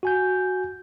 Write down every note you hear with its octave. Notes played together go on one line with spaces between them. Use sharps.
F#4 G#5 G6